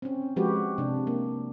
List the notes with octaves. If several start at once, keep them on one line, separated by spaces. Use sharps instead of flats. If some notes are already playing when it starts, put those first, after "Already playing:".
C4 C#4
F3 G#3 F#4 G4 B4
C3 D4
A#3